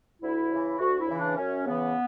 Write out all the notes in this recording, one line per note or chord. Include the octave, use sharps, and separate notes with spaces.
D2 E4
C#3 E3
D2 F#4
E4
C#3 E3
D4
F#2 C#4
C#3 E3 B3